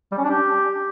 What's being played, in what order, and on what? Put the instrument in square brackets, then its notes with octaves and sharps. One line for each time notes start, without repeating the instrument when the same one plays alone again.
[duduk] G3
C#4
D4
G4